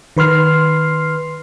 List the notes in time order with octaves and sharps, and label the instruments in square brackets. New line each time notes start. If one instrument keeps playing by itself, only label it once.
[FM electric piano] D#3 B4 C6 F6 C7